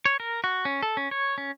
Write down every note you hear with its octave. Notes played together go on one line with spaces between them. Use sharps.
C#5
A#4
F#4
C#4
A4
C#4
C#5
C#4